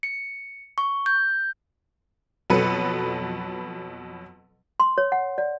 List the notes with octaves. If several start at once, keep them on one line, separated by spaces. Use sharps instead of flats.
C#7
C#6
G6
F2 B2 F#3 A4 B4 C#7
C6
C#5
F#5
D5